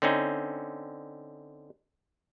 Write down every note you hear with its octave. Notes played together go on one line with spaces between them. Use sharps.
D3 C4 C#4 D#4